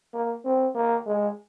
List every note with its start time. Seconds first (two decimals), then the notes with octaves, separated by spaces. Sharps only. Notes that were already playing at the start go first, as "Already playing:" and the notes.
0.14 A#3
0.45 C4
0.75 A#3
1.06 G#3